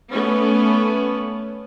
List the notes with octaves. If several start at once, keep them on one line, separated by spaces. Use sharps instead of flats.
A3 B3 C#4